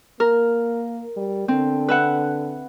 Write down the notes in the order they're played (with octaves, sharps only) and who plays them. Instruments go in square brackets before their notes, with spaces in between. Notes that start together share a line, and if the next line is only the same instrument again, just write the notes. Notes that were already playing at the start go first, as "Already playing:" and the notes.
[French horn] A#3 [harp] A#4
[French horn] G3
[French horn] D3 [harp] C4
[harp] B4 E5 F#5